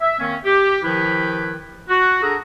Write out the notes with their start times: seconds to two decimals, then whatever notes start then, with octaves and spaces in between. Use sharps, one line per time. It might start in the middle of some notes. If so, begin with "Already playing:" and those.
0.01 E5
0.20 D#3 A#3 C4 C#4
0.45 G4
0.83 D#3 F3 E4 G4 B4
1.89 F#4
2.22 D4 G#4 A4 F#5 A#5